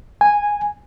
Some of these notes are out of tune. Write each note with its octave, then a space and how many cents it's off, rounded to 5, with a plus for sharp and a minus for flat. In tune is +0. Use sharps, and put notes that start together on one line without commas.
G#5 -10